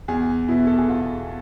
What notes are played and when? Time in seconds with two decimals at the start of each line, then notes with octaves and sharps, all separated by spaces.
0.08 E2 G#4
0.48 B2 B3 E4
0.67 A4
0.78 G#4
0.89 E2 F4